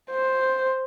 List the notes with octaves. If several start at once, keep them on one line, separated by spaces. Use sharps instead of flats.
C5